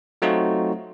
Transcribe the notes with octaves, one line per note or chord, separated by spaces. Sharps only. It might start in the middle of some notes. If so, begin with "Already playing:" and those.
F#3 A3 C4 D#4 F4 F#4